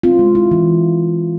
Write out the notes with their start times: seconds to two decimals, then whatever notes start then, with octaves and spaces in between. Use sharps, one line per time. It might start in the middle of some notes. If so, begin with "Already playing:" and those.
0.03 C4 F4
0.19 G#3
0.35 E4
0.51 E3